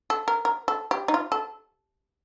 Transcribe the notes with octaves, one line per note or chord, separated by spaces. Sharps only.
A4
A#4
A#4
A4
G4
D#4
F4
A4